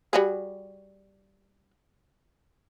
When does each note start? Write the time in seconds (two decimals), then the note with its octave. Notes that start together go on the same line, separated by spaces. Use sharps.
0.13 G3 F#4 G#4